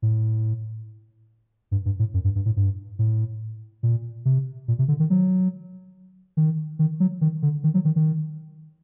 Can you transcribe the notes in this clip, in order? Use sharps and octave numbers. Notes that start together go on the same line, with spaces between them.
A2
G2
G2
A2
F#2
G2
G2
A2
G2
A2
A#2
C3
A#2
C3
D3
D#3
F#3
D#3
D#3
F#3
D#3
D3
D#3
F#3
D#3
D#3